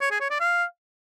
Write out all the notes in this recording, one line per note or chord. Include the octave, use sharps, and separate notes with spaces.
C#5
G#4
C#5
D5
F5